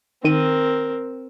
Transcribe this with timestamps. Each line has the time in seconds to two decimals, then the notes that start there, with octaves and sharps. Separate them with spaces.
0.24 D#3 C4 A#4 D#7